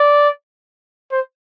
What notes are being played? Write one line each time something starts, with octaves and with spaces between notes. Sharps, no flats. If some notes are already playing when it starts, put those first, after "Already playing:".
Already playing: D5
C5